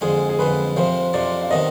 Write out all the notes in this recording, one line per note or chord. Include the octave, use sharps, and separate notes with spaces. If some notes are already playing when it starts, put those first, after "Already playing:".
F2 D3 G#3 G#4
G#4
F2 D3 G#3 B4
F2 C3 F3 C5
F2 C3 F3 D5
F5
C3 D#3 B3 D4 D#5